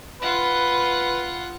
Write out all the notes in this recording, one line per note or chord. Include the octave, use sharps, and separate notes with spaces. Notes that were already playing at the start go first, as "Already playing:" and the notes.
F4 B4 F#5